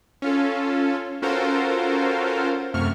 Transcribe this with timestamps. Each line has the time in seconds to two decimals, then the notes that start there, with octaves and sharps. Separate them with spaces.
0.22 C#4 F4 A4
1.22 C#4 F4 F#4 A4 A#4 C5
2.74 F#2 C3 A3 C#6 F6